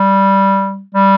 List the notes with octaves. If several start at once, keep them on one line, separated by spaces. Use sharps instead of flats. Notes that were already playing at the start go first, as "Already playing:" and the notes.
Already playing: G3
G3